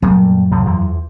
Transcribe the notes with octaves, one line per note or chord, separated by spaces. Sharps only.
F#2 A#2 G3 A3
C2 A2 F3
E2 E3 F3